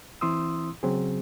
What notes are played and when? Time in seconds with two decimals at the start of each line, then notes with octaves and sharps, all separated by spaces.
0.21 E3 C4 E4 C6 D#6 E6
0.83 C#3 F#3 C4 G#4